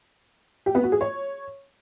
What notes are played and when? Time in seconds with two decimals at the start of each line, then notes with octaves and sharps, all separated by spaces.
0.66 G4
0.75 B3
0.83 F#4
0.92 G#4
1.01 C#5